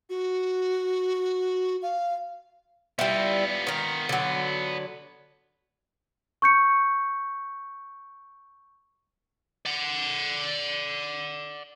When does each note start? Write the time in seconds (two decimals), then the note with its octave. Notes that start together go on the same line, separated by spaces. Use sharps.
0.10 F#4
1.82 F5
2.99 G3 B3 E4 F4
3.67 D#3 A#4
4.09 D3 F#3
6.42 C#6 G6 C#7
9.66 D5 F#5